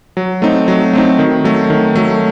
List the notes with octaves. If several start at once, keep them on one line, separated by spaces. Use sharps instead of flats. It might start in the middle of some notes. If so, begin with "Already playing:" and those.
F#3
A3 C4 D#4
F#3
A3 C4 D#4
D#3
F#3 A3
D#3
F#3 A3